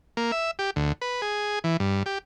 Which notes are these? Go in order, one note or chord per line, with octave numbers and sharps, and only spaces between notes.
A#3
E5
G4
D2
B4
G#4
E3
G2
G4